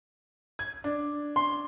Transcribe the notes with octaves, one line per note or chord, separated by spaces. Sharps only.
G#6
D4
C6